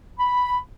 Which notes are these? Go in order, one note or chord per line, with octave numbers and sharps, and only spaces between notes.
B5